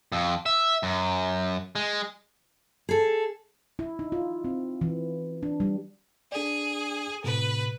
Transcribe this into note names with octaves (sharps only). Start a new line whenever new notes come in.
F2
E5
F#2
G#3
G#4 A4
E4
D#4
F4
C4
E3
D4
G3
D4 G#4 D5
A2 C3 B4